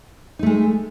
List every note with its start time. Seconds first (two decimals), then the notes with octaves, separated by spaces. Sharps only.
0.39 D#4
0.43 A3
0.46 G#3